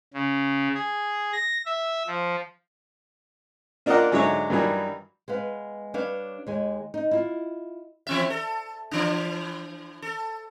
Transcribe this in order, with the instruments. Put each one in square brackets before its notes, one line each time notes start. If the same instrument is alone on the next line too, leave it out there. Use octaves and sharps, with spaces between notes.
[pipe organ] C#3
G#4
A#6
E5
F3
[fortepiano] A#3 D4 F4 A#4 D#5 F#5
G#2 D3 F#3 G#3 C#5 E5
G2 D#3 E3 F#3 G3
[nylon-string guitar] G#3 B3 B4 F5
G3 D4 B4 C#5 F5
D#2 G#3 G#5
D#4
E4 F4
[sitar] E3 C4 E5
A4
E3 D4
A4